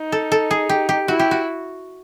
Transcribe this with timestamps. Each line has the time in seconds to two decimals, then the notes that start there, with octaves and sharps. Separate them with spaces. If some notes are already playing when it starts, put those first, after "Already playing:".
Already playing: D#4
0.12 A4
0.32 A4
0.51 G#4
0.69 G4
0.89 G4
1.08 E4 F#4
1.19 G4
1.31 F#4